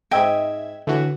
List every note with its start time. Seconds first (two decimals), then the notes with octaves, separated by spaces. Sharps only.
0.11 G#2 D#5 E5 G5 G#6
0.87 A2 D3 E3 F#4